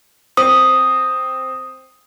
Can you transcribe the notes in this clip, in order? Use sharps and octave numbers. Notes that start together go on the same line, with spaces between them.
C4 D#6